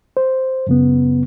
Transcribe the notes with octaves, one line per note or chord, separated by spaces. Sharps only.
C5
F#2 C#3 B3